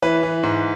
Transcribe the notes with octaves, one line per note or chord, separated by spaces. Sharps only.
E3 B4
E3
G#2